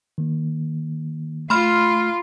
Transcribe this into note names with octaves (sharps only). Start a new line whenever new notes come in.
D#3 A#3
A3 F4 B5 C6 F6